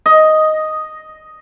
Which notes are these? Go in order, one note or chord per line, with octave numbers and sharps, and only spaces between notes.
D#5